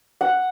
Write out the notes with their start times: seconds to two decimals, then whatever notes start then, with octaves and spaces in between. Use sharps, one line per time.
0.21 F#5